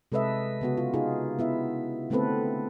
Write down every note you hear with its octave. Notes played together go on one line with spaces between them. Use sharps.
C3 G#3 A4 B4 D#5 E5
C#3 B3 F#4
F4
D#4 F4 G#4
B3 E4 E5
D3 A3 B3 C4 A4 B4